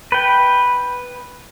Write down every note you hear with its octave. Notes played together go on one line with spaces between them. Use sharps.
B4 G5